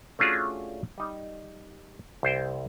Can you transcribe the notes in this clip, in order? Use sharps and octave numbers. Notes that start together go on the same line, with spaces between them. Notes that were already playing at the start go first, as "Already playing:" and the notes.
A3 C#4 D4 F4 F#4 G#4
G3 D#4
C2 C5 G5